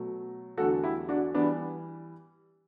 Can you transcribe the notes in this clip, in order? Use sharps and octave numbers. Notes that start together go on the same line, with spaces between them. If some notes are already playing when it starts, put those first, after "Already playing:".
Already playing: B2 F#3 A3
E2 D3 F#3 A3 F#4 A4
E4 G4
D4 F#4
E3 G3 B3 D4